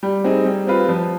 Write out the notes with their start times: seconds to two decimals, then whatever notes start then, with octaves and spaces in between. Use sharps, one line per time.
0.03 G3
0.24 C4 D#4 G#4
0.45 G3
0.67 C4 F4 B4
0.89 F3